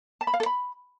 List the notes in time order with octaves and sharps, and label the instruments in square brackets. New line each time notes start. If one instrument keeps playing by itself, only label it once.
[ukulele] A5
B5
F5
A4
B5